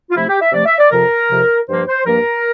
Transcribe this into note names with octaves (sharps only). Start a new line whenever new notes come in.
F4
C3 F3 A3 E4
G4
E5
C3 F3 A3 D5
E5
D5
F2 C3 F3 A#4
F2 C3 F3
G2 F3 A#3 C5
C5
G2 F3 A#3 A#4